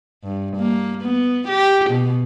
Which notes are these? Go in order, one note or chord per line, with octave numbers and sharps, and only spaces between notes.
G2
A#3
B3
G4
B2